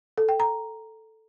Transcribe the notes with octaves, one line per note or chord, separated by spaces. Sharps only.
A4
G5
A#5